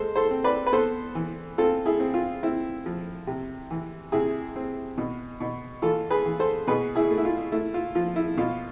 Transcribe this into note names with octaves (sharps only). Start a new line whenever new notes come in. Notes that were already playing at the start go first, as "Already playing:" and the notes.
Already playing: G#3 A4 C5
A4 C5
C4
B4 D5
B4
B3 A4 C5
E3
C4 F4 A4
E4 G#4
C4
F4
C4 E4
F3
C3
E3
C3 E4 G#4
C4
B2
B2
E3 F4 A4
G#4 B4
E3
A4 C5
B2 G#4 B4
E4 G#4
A3
E4
F4
A3 E4
F4
F3 F4
E4
B2 F4